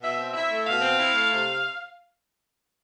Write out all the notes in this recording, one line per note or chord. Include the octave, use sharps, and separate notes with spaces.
B2 E5
C4
E4 E5
A3
B2 F5
C4
E4
A3
C3